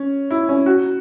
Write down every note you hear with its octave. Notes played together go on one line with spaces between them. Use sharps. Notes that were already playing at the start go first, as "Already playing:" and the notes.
Already playing: C#4
E4
C#4
F#4